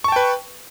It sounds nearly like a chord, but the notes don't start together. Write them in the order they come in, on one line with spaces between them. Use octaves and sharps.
C#6 A5 G5 B4